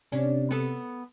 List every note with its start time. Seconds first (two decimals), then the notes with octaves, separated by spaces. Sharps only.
0.12 C3 C#4 D4
0.51 B3 A4